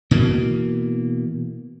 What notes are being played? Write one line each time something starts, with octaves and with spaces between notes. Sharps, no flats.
B2 E3 A#3